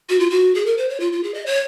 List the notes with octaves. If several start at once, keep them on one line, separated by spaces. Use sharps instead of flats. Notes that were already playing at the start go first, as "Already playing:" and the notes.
F#4
F4
F#4
G#4
A#4
C5
C#5
F4
F4
G#4
D#5
C#5